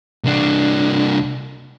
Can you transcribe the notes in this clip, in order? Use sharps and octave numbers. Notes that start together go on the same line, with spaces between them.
C2 D4